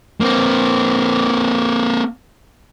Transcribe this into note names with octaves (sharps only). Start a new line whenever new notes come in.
A#3 C4